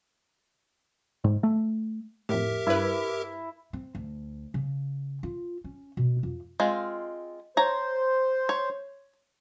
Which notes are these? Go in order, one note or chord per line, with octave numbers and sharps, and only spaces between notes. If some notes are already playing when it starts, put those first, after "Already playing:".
G#2
A3
F2 A2 G4 A#4 E5
G2 E4 B4
C4
D2
C#3
F4
C#4
B2
F2
G#3 C4 F4
C5 C#5 A#5
C#5